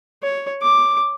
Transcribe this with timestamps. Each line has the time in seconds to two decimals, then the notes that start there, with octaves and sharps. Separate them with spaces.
0.23 C#5
0.62 D6